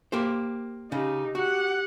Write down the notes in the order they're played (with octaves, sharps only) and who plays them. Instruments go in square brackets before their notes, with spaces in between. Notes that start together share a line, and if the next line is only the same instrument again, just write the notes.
[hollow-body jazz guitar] A#3 G4 C5
[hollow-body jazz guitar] C#3 [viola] D#4 G4
[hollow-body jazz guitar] F#4 [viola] G4 F#5